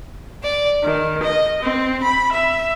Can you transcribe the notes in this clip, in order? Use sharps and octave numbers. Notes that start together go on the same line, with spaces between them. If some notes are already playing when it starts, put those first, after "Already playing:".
D5
D#3
D#5
C4
B5
E5